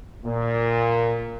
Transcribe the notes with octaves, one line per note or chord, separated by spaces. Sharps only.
A#2